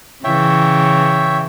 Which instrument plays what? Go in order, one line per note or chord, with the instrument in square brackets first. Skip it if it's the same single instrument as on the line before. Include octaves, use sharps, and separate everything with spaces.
[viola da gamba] C#3 E3 [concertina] C#5 E5 G5